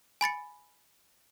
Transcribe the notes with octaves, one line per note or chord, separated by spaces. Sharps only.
G#5 B5 A6 C#7